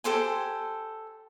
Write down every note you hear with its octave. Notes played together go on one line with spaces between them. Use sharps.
G4 A4 C5 G#5